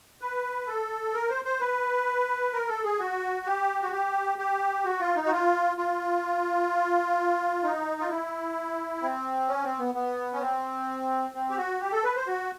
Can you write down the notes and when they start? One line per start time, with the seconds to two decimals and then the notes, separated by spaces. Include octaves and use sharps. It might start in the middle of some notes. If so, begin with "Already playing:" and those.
0.21 B4
0.67 A4
1.14 A#4
1.29 C5
1.45 C5
1.60 B4
2.53 A#4
2.68 A4
2.84 G#4
2.99 F#4
3.46 G4
3.82 F#4
3.92 G4
4.38 G4
4.85 F#4
5.00 F4
5.16 D#4
5.26 F#4
5.32 F4
5.77 F4
7.63 D#4
8.01 F4
8.09 E4
9.02 C4
9.48 C#4
9.64 C4
9.79 B3
9.95 B3
10.33 C#4
10.41 C4
11.34 C4
11.50 G4
11.57 F#4
11.80 G4
11.92 A4
12.04 B4
12.16 C5
12.27 F#4